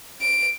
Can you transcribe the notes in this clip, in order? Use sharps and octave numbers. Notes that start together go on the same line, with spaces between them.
D7